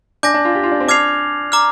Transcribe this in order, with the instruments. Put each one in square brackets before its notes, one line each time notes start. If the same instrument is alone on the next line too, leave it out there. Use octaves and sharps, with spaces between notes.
[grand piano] D4 [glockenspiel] G#5 D6 G6 A#6
[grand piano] D4
F4
G4
F4
D4
C4
[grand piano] D4 [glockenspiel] D6 F6 G#6 C7 F7
[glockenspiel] A#5 D6 F6